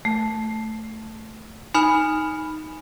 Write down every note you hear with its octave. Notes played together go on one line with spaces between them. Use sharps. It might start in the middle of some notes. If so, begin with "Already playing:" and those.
A3
D#4 G#5 B5 F6